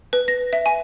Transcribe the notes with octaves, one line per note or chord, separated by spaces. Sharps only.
B4
A#6
E5
G#5